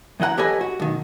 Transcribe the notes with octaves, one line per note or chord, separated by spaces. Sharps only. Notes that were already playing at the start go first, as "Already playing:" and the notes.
F#2 E3 D#5 F#5 A#5
G4 A4 B4 C#5 D#5 G#5
F#4
B1 D#3